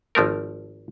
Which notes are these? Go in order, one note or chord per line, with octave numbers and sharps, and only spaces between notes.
G#1 F3 A3 A#4